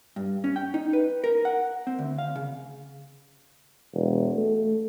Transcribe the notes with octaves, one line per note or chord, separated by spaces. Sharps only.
G2
C#4
G5
D#4
B4
A#4
F#5
C4
D2
F5
C#3
E1
A3